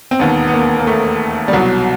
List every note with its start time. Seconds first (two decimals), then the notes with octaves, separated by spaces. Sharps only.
0.11 C4
0.19 E1 D#2 D#3 B3
0.47 B3
0.54 A#3
0.79 A#3
0.87 A3
1.48 G3
1.53 C2 B2 F#3